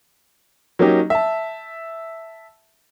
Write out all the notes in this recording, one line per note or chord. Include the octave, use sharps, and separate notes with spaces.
F#3 A#3 C#4 D#4 G4
E5 A5